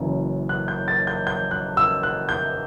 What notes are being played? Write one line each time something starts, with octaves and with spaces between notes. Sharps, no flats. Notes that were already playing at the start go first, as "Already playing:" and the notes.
Already playing: F#1 F#2 E3
F#6
G6
A6
G6
G6
F#6
E6
F#6
G6